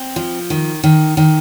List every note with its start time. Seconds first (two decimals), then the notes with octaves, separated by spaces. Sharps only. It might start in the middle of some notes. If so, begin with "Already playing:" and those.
Already playing: C4
0.16 F3
0.50 D#3
0.84 D#3
1.17 D#3